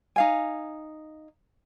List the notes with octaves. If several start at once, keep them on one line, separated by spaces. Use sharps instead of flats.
D#4 F5 G#5